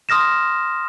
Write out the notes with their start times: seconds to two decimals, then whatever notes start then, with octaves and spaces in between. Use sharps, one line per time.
0.09 C6 D#6 F6 A#6 E7